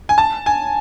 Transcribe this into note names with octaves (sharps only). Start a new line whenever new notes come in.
G#5
A5
G#5